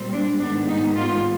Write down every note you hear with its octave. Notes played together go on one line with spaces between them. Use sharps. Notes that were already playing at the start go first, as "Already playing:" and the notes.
Already playing: A#2 G3 C4
D4
G#2 D#3 G3 B3 D4
D#4
F4